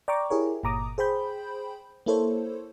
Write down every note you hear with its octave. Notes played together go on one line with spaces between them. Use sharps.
D5 G5 A#5 C#6 D6
E4 G4 G#4 A#4 C#5
G1 A#2 A#5 D6 D#6
G#4 C5 G5 B5 G6
A#3 E4 A4 C5 C#5